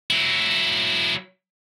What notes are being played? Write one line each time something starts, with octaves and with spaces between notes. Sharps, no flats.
F#3 E4